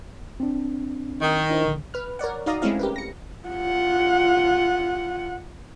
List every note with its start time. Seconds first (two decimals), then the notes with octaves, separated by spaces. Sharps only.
0.40 C4 D4
1.22 D#3
1.50 D4 E4 C5
1.65 A#1 D3
1.94 B4 F6
2.19 A#4 C#5 D5 F#5
2.46 D#4 F#4 D5 F5 A#5 D#6
2.62 G#3 A3 C4 C#4 E4 F5
2.79 G4 A#4 B4
2.96 A#6 C#7
3.48 F4 F#5